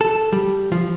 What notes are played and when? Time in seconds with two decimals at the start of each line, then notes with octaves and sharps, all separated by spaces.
0.01 A4
0.33 G3
0.72 F3